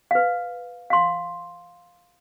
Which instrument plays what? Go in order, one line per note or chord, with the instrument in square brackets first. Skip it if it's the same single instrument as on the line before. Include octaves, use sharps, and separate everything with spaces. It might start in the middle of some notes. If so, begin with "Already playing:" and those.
[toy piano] B4 F5
F5 C6